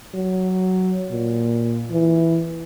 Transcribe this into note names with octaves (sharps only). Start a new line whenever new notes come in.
F#3
A#2
E3